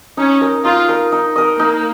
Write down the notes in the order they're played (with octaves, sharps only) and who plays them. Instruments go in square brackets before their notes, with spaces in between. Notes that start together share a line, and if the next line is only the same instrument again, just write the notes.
[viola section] C#4 [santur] D#4
[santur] A#4 D#5
[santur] D#4 [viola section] F4
[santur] A#4 D#5
D#4
A#4 D#5
[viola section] A#3 [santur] D#4